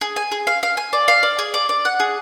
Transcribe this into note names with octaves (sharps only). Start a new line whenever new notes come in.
G#4
G#5
G#4
F5
F5
G#5
D5
F5
D5
G#4
D5
D5
F#5
G#4